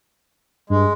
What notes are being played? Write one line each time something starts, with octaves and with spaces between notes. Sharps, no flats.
G2 G#3